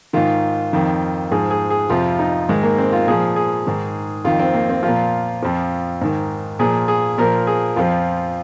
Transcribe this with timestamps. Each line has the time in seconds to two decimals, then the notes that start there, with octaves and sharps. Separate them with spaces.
0.13 G#2 D#3 F4
0.73 F2 D#3
1.31 G#2 F3 G#4
1.51 G#4
1.70 G#4
1.90 F2 C3 F3 F4
2.19 D#4
2.49 G#2 D#3 G#3
2.63 A#3
2.78 C4
2.92 F4
3.07 A#2 F3 G#4
3.36 G#4
3.67 G#2 D#3
4.25 F2 D#3 F4
4.39 C4
4.54 A#3
4.69 C4
4.83 F3 F4
4.88 A#2
5.43 F2 F3
6.01 G#2 D#3
6.59 A#2 F3 G#4
6.88 G#4
7.18 A#2 F3 A#4
7.47 G#4
7.76 F2 F3 F4